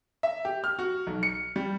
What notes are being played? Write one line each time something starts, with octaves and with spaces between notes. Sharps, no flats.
E5
G4
F6
F#4
B1
C#7
G3